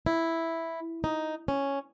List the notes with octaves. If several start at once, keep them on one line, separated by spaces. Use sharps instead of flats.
E4
D#4
C#4